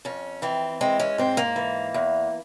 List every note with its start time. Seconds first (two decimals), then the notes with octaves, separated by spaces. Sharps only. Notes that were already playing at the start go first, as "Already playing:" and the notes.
0.05 F2 C#4
0.42 E3 C4
0.81 G#3 C4
1.00 C#4
1.18 G#2 C4
1.37 A#3
1.56 E3
1.94 E2